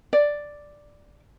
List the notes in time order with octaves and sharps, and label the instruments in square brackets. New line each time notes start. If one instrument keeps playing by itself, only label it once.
[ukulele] D5